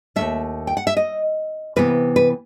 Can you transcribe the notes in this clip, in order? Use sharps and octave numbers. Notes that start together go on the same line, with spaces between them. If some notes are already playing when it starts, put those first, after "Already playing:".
D#3 A3 E5
D#2
G5
F#5
E5
D#5
C3 E3 B3 B4
B4